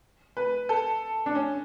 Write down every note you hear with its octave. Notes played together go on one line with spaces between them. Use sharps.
B4
A4
D4
C#4